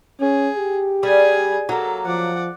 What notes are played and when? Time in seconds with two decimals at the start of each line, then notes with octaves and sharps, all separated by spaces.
0.21 C#4 G#4
0.56 G4
1.03 G3 G#4 G#5
1.69 F#3 A#3 A4
2.06 F3 D5 F#5